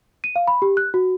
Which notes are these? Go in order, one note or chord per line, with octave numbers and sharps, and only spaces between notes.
D#7
F5
B5
G4
F#6
F#4